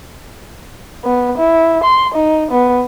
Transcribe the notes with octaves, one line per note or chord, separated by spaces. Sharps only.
B3
E4
C6
D#4
B3